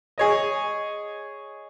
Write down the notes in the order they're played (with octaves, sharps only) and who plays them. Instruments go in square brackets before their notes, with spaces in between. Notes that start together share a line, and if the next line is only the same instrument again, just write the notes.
[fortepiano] G#4 C#5 D#5